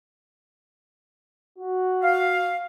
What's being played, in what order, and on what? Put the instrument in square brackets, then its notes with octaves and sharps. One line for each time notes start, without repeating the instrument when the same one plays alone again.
[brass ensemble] F#4
[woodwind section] F5